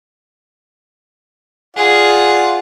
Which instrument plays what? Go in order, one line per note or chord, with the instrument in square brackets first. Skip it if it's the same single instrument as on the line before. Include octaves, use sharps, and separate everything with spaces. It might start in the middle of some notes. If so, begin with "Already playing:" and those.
[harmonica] F4 D5 F#5 [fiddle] G#4